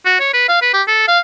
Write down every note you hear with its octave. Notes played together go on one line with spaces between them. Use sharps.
F#4
C#5
B4
F5
B4
G4
A4
F5